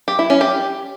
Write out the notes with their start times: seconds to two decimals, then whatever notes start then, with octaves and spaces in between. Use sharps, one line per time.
0.08 G4
0.19 E4
0.30 C#4
0.41 G4